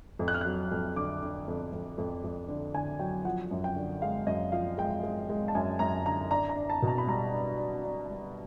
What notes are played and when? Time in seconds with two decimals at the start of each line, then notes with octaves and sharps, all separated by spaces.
0.19 F2
0.28 F#6
0.34 F6
0.41 F#3 F#6
0.71 F2
0.96 D3 D6
1.22 D3
1.48 F2
1.72 F2
1.98 F2
2.24 F2
2.48 D3
2.74 D3 G#5
2.99 F#3 G5
3.25 F3 F#5
3.51 F#2
3.64 G5
3.76 D3
4.02 G#3 F5
4.27 F#2 D#5
4.52 F3 F5
4.78 G#3 G5
5.03 G#3
5.30 G#3
5.48 A5
5.55 F#2 G#5
5.79 F#2 A#5
6.05 D3 A#5
6.31 D4 A#5
6.49 A#5
6.56 D4
6.70 A5
6.82 B2
6.88 A#5
6.98 B5
7.07 G3 A#5
7.32 D4
7.58 D4
7.84 D4
8.09 G3